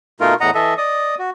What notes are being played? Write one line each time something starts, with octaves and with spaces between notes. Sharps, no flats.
B2 A3 D#4 F4 A#4
E2 A2 D#5 F#5 A#5
E3 A4 D#5 E5
D5 D#5 D#6
F#4